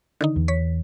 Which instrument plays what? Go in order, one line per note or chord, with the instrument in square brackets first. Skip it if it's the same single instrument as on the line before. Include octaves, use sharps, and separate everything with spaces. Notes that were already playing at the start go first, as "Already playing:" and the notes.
[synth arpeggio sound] D3 D#3 D#4
[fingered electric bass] E2
[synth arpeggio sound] C#5 B6